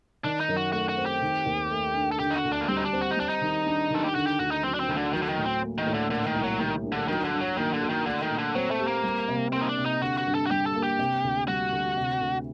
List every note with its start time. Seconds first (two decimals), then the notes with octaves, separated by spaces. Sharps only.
0.24 D#3 D4
0.40 D#4
0.48 F#2
0.56 F#4
0.72 A3 F#4
0.89 F#4
0.98 C4
1.06 G4
1.22 D#3
1.46 D#2
1.71 A3
1.95 D4
2.12 A4
2.19 D3 G4
2.30 D#4
2.36 F#4
2.44 D2
2.52 D4
2.61 A#3
2.68 G3 C4
2.77 D#4
2.85 D4
2.93 C4
3.01 F#4
3.11 D#4
3.17 G3 D4
3.29 D#4
3.41 D#3
3.66 D4
3.91 D#3 A4
4.04 G4
4.15 D3 F#4
4.27 G4
4.39 D2 F#4
4.51 D#4
4.63 F#3 C4
4.74 D4
4.80 C4
4.88 D2 D#3
4.96 D3
5.13 D#3 F#3
5.22 D3
5.29 D#3
5.37 A2
5.45 C4
5.62 A#3
5.78 D#3
5.86 A2
5.94 D3
6.10 A#2 D3
6.27 D#3
6.35 C2
6.43 F#3
6.59 D#3 G3
6.84 D4
6.92 D3
7.08 D#3 F#3
7.24 D3
7.33 G2
7.41 F#3
7.57 D#3 A#3
7.73 D3
7.81 F#4
7.90 D#3
8.06 D3 A3
8.22 D#3
8.30 A#2
8.38 D3
8.55 F#3 C4
8.71 A3
8.79 G4
8.87 A#3
9.03 G3
9.28 C3
9.53 A#3 C4
9.61 D#4
9.69 D4
9.77 C3
9.85 D#4
10.01 D3 F#4
10.17 F#4
10.26 G2
10.35 A4
10.46 F#4
10.51 G3 G4
10.66 A4
10.75 A#3
10.83 G4
10.99 C3
11.24 D2
11.48 G3 F#4
11.73 D2
11.97 C3
12.21 D2